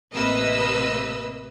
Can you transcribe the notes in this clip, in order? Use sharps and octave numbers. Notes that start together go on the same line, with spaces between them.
A1 C3 A#3 B4 D#5 E6